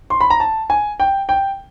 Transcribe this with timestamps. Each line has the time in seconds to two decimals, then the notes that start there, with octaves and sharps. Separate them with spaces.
0.10 C6
0.21 B5
0.30 A#5
0.40 A5
0.70 G#5
1.00 G5
1.29 G5